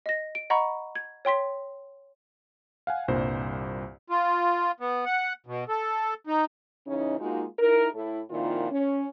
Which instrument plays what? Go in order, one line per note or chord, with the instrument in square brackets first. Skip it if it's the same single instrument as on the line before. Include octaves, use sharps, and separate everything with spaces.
[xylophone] D#5 A#6
D7
D#5 F#5 A#5 B5 C#6
G#6
C#5 G5 C6 B6
[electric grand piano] F5 F#5 G#5
C2 G2 A#2 C5
[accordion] F4
B3
F#5
B2
A4
D#4
[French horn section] C#3 E3 C#4 D#4
G#3 A#3 D#4 F4 F#4
D#4 E4 A#4
A2 E4 A4
F2 A#2 D#3 E4 F4
C#4